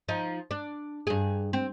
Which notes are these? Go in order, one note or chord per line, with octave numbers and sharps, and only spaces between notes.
F3 D#4
D4
G2 G#4
C4